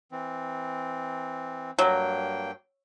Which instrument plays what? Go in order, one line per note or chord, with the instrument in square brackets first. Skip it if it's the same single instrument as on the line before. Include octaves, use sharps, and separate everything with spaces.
[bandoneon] E3 C4
[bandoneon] G2 A#3 G5 [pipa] F#3